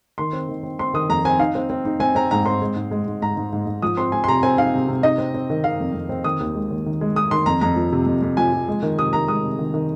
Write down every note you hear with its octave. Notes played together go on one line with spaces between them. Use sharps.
D#3 C6
C4
D#3
C4
C4 C6
D#3 D#6
F2 A#5
C4 G#5
D#4 F5
C4
C4
D#4
C4 G#5
C4 A#5
G#2 A#5
C4 C6
G#3
G#2
G#3
G#2
G#2 A#5
G#2
G#2
G#2
F3 D#6
C4 C6
F3 G#5
C6
C3 A#5
C4 G#5
D#4 F5
C3
C3
D#4 D#5
C4
C4
D#3
D#3 F5
F2
F2
C4
D#3 D#6
D#2
G#3
D#2
D#3
G#3
G#3 D#6
D#3 C6
F2 A#5
F2 A#5
F3
C3
F2
F2
F3 G#5
F3
G#3
D#3
C3 D#6
D#3 A#5
G#3 D#6
C3
D#3
D#3